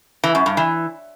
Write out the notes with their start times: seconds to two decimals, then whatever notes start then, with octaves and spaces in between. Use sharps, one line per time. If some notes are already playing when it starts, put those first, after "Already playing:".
0.24 E3
0.35 F#2
0.46 G2
0.57 E3